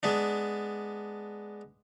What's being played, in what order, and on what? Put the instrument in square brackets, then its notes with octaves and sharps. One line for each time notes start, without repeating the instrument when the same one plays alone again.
[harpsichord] G#3 B3 D4